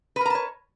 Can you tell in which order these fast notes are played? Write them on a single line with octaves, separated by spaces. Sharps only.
B4 A#4 A#5 A5 C#5